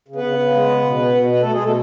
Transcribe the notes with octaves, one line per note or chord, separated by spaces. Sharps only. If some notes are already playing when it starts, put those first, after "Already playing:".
C#3
B3 B4
C#3
C#3
G#3
C#3
B2
B3
B2
B3 B4
B2 A3 A4
G#3 G#4
B2 A3 A4